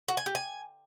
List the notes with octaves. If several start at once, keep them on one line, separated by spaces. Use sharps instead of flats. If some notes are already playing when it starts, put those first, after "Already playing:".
F#4
G#5
G4
G#5